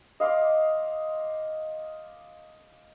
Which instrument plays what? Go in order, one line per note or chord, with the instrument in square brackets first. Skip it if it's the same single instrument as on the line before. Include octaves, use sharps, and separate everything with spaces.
[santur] D#5 F5 C6 D6